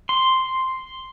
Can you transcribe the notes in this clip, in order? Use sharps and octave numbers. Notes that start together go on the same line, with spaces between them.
C6